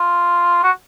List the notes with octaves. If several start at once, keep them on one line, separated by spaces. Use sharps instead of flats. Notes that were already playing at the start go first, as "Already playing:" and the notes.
Already playing: F4
F#4